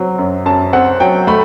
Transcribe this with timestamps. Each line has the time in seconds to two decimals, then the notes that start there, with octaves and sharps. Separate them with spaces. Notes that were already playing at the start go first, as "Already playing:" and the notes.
Already playing: F#3 C4
0.19 F#2
0.46 F#2 A5
0.73 C4 F#5
1.00 F#3 G5
1.27 A3 B5